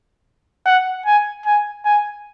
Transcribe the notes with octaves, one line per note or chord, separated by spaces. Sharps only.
F#5
G#5
G#5
G#5